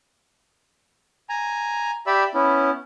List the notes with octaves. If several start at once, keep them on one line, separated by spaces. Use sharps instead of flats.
G#5 A#5
G4 D5 E5 B5 E6
B3 C#4 E4